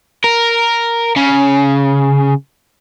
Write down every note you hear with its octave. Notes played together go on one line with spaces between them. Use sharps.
A#4
C#3